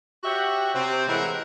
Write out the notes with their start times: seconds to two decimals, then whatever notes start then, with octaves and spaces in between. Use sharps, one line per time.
0.23 F#4 G4 C#5 E5 F#5
0.74 C3 C4
1.07 A2 E3 G#3 E4 A#4 F#5